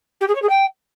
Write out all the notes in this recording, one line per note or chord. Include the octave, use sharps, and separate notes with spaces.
G4
G#4
C#5
G#4
G5